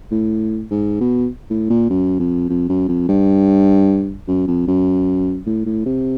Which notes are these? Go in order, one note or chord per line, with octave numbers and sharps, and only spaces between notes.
A2
G#2
B2
A2
A#2
F#2
F2
F2
F#2
F2
G2
F#2
F2
F#2
A2
A2
C3